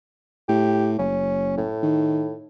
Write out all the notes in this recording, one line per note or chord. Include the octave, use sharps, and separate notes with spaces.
A2 G4
F#1 C#4
A2
D#3